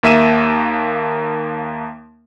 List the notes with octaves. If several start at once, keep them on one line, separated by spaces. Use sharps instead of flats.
D#2 A#3 E5 E6 D#7 E7